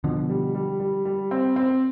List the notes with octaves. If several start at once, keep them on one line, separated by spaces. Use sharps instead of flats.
B2 D3 F3
G3
G3
G3
G3
C4
C4